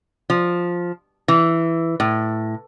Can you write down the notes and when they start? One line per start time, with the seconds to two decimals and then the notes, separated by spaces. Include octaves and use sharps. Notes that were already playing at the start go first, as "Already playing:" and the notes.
0.30 F3
1.28 E3
2.00 A2